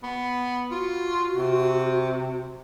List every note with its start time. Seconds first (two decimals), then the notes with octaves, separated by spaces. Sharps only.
0.03 B3
0.71 F4 F#4
1.36 C3